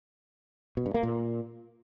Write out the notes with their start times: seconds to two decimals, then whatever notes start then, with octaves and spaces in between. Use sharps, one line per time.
0.77 B2
0.86 G2
0.94 A#3
1.03 A#2